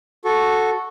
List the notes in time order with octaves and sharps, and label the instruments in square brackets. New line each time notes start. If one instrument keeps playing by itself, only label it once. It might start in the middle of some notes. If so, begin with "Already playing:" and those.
[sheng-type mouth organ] F#4 A4